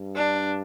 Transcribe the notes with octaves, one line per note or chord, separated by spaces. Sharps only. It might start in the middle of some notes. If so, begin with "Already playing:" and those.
Already playing: G2
D4